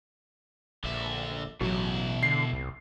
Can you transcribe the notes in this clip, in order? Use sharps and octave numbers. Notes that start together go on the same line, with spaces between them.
A#1 D3 E5
A1 B2 F#3 E4
D3 C7
C2